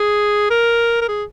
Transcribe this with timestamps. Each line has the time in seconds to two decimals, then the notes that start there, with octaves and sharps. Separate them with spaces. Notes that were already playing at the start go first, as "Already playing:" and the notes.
Already playing: G#4
0.50 A#4
1.01 A#4
1.08 G#4